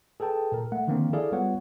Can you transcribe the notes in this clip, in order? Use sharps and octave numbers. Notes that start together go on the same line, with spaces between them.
G#4 A4 B4 G5 A5
A#2 A#4
A3 F#5
D3 D#3 F3 A#3 C4 D4
E4 G#4 A4 D5 F5
G3 B3 F4 B4 C#5 F#5